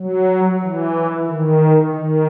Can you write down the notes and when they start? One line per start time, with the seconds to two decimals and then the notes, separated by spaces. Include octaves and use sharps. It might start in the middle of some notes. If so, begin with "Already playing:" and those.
Already playing: F#3
0.61 E3
1.27 D#3
1.93 D#3